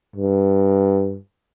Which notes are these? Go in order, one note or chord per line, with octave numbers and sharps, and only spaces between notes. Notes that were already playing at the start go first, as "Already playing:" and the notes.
G2